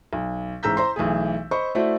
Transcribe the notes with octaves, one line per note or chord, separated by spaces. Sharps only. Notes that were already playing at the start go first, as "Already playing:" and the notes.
B1
A1 G#2 A#5 E6 G6 B6
C5 A#5 C6
B1 E3 A3 G#4
C5 D#5 B5 C#6
A3 E4 F#4 C5 D5